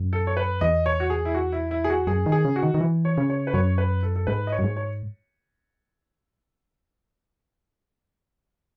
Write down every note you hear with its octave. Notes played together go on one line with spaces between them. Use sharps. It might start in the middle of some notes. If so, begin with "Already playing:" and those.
Already playing: F#2
A4
C#5
B4
E2 D#5
C#5
F#4
G#4
E4
F#4
E4
E4
G#4
F#4
F#2 G#4
D#3
G#4
C#3
F#4
D#3
D#3
E3
C#5
C#3
C#5
B4
F#2 C#5
B4
A4
A4
G#2 B4
D#5
C#5
F#2
G#2
C#5